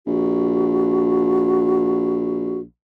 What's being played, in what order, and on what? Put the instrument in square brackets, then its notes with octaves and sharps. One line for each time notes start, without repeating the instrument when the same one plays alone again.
[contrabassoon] A#1 [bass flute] F#4